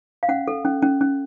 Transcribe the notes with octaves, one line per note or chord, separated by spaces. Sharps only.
F5
C#4 F#5
A4
C#4
C#4
C#4